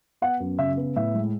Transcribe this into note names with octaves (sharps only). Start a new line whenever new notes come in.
B3 F#5
F#2
C#3 E5
B3
A2 E5
G#3